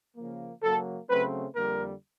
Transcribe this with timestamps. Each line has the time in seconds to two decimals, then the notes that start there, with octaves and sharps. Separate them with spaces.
0.17 C#3 F3 A#3
0.62 C#3 F#3 A#3 A4
1.09 C#3 F#3 A3 C4 B4
1.55 F2 D3 G3 A#3 A#4